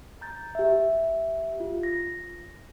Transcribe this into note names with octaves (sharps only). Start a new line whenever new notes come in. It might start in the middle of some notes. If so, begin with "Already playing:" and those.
A#5 G6 A6
G4 E5
F4
A#6